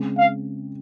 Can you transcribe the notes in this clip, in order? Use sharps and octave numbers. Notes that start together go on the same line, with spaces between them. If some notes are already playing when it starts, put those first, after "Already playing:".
Already playing: C#3 G#3 C4
F5